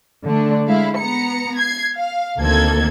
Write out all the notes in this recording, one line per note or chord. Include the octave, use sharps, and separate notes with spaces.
D3 A3 D4
G#3 E4 F5
B3 A#5 C#7
G#6 C7
F5
D2 D#3 A#3 C4 A4 G#6